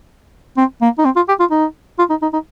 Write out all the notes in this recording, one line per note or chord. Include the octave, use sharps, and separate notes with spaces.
C4
A#3
D#4
C4
F4
G4
F4
D#4
F4
D#4
D#4
D#4